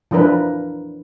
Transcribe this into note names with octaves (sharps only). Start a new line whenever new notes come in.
E3 F3 D4 A#4 B4